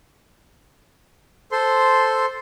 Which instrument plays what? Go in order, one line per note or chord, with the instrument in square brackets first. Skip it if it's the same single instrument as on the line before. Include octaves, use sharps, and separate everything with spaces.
[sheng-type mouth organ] A4 C5 C6